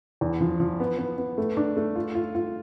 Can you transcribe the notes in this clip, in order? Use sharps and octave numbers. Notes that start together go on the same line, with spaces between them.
E2
F3
F3
B3
B3
B3
A3
D4
A3
F4
F4
F4